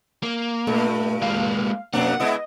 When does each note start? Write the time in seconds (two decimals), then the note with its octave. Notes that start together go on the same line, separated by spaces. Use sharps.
0.23 A#3
0.67 G2 A#2 A3
1.22 G#3 A#3 F5
1.93 F2 B2 A#3 D4 F#5
2.20 G#3 B3 E4 D#5